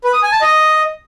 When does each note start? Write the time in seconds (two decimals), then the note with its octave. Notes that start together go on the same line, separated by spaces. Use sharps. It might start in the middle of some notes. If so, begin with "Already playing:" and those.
0.04 B4
0.13 D#6
0.23 G#5
0.32 A5
0.41 D#5